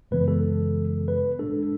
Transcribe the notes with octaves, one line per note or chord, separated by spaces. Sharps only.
F#2 C#3 E3 G#3 B3 B4
A4
B4
A2 G#3 D4 A4